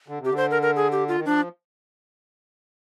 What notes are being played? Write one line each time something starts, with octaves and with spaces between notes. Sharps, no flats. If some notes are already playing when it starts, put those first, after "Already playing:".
D3
C3
G4
D3
C5
A#4
A#4
G#4
G4
F4
D#3
F3 D4